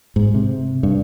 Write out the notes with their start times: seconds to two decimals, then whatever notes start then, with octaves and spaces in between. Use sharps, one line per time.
0.16 G#2
0.35 C3
0.83 G2